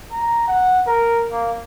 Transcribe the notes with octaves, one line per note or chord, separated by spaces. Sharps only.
A#5
F#5
A#4
A#3